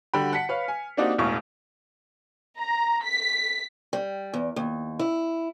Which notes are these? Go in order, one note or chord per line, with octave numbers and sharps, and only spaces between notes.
D3 G3 F#4 G5 B5
F#5 A5 B6 C#7
B4 C#5 F5 F6
G#5
A#3 C4 D4 D#4 F#4 G4
E1 A1 E2 E4 F5 C#6
A#5
B6
G3
E2
D#2
E4